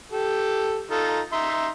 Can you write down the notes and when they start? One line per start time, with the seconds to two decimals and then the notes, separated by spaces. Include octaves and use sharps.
0.12 G4 A4
0.91 D#4 F4 A4
1.32 D#4 E5 C6